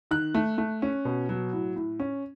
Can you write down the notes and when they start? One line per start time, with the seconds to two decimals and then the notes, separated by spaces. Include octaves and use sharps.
0.11 D#3 F#6
0.34 A3
0.58 A3
0.82 C#4
1.05 B2
1.29 F#3
1.53 A2
1.76 A2
2.00 C#4